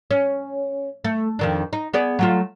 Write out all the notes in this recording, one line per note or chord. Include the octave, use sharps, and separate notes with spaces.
C#4
A3
F2 D#3 D4
D#4
B3 G#4 D5
F#3 A3 F4